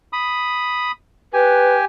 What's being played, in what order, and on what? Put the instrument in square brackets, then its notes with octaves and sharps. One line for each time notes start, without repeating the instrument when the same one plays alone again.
[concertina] B5 D#6
[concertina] G4 G#5 [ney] B4